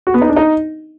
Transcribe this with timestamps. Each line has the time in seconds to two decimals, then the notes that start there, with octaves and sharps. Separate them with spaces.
0.07 F#4
0.14 B3
0.22 D#4
0.29 D4
0.37 D#4